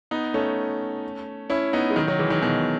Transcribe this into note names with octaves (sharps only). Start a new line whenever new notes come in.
B3 D#4
A3 C#4
C#4 E4
B3 D#4
G#3
D#3 F#3
D#3 F#3
E3 G#3
D#3 F#3
B2 D#3
B2